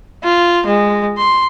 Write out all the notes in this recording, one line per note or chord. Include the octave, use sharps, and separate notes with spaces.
F4
G#3
C6